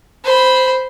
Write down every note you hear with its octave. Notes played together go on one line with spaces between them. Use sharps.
C5 B5